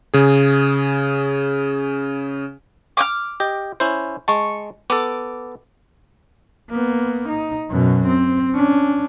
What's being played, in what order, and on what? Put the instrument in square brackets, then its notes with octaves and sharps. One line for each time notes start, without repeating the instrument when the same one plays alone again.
[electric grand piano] C#3 G#4
[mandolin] D6 D#6 F6
[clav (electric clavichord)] G4 D#5
C#4 E4 C5
[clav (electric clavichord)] G#3 A5 [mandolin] C#6
[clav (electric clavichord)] B3 A4 [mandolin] D6
[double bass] A#3 B3
D#4
F#2 B2
C4
C#4 D4